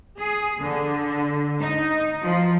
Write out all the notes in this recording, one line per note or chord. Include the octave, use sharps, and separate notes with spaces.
G#4
D3
D#4
F3